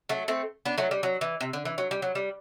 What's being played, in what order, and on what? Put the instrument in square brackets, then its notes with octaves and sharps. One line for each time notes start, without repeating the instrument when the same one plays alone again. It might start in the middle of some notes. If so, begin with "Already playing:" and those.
[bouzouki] F#3 A3
A3 C4
B3 D4
F#3 A3
G3
F#3
E3
C3
D3
E3
F#3
G3
F#3
G3